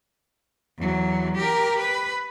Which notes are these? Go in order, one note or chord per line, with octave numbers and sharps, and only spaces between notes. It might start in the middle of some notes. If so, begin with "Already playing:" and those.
E2 F#3
G4 A#4
B4